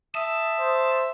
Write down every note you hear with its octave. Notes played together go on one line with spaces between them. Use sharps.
E5 A5 D#6
C5